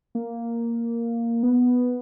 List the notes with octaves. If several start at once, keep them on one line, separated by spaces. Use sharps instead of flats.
A#3
B3